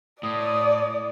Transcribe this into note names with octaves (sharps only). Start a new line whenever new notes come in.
A2 D5 D#6